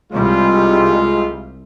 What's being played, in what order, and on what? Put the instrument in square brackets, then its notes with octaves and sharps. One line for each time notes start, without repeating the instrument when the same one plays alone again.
[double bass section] C2 C3 G3 [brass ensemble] G#3 F4